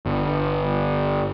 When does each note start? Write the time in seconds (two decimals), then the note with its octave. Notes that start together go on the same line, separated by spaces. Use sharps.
0.06 G1